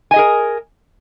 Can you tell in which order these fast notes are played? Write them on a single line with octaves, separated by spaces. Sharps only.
G#5 D#5 G#4 A#4